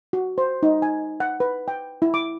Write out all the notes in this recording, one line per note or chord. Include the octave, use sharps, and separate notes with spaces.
F#4
C5
D#4
G#5
F#5
B4
G5
E4
D6